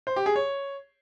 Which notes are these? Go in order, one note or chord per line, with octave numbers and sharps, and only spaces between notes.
C5
G4
G#4
C#5